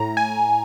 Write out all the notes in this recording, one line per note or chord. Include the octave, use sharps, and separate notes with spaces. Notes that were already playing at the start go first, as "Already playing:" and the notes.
Already playing: A2 A#5
G#5